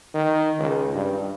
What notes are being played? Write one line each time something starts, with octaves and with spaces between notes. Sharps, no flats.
D#3
C#2
G2